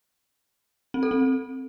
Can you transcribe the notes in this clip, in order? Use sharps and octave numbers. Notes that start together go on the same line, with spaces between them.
C4
A4
C4